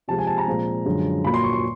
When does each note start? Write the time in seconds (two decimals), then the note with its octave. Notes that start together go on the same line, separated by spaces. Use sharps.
0.08 C3 F3 G#3 A5
0.18 G#5
0.27 A5
0.38 A#5
0.48 A#2 F3 G#3 C4
0.85 F#2 D3 F3 G#3
1.25 A#2 F#3 A#3 B5
1.34 C6
1.44 C#6
1.53 C6